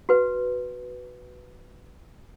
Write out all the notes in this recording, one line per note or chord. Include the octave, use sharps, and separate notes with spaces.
F#4 B4